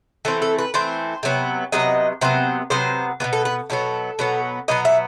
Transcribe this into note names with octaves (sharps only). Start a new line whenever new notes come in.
E3 A3 C4 A4
A4
B4
E3 A3 C4 C5
C3 F#3 B3
C3 F#3 B3 D#5
C3 F#3 B3 C5
C3 F#3 B3 C5
B2 F#3 B3 B4
A4
B4
B2 F#3 B3 A4
B2 F#3 B3
B2 F#3 B3 D#5
E5